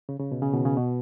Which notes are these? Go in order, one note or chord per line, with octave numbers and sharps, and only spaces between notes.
C#3
C#3
B2
C#3
B2 D#3
C#3
B2